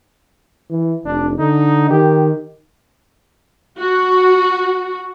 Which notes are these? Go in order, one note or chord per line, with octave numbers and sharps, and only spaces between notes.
E3
F1 D4
D3 D#4
D#3 G4
F#4